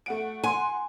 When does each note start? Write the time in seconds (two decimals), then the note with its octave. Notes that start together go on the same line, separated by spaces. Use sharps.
0.06 A3 F#5 D7
0.44 F#5 G#5 C6